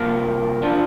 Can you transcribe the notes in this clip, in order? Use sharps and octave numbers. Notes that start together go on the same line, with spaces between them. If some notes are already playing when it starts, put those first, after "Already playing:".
Already playing: C2 C3 F3 A#3 A#4
F3 D4 F4